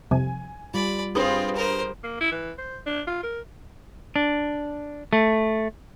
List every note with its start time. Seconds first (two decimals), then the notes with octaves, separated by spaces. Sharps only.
0.11 C2 F2 G#5
0.74 G3 F4 D5 B5
1.15 G2 C4 F4 G#4 B4 D#6
1.56 A#4 C5
2.04 A#3
2.20 E4
2.32 E3
2.58 C5
2.86 D4
3.07 F4
3.23 A#4
4.16 D4
5.13 A3